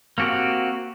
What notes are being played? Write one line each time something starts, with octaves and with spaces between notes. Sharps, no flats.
A#3 C4 F#4 G4